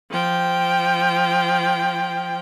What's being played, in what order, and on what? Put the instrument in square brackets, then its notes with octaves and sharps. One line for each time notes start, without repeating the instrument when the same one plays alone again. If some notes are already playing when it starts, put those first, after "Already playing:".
[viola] F3 G5